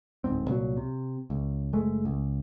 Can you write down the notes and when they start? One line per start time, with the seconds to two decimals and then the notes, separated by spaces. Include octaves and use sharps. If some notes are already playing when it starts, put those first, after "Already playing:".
0.24 D1 G#2 C4
0.48 C2 A#2 F#3
0.77 C3
1.30 C#2
1.73 F#1 G#3 A3
2.05 C#2